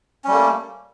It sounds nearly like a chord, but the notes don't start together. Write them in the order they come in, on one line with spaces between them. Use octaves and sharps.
C#4 G3 A3 A#3